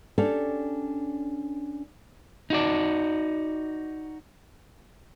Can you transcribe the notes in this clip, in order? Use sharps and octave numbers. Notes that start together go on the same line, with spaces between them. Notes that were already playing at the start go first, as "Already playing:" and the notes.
C#4 D4 G4 A4 C#5 D5
D#4 F#4 D5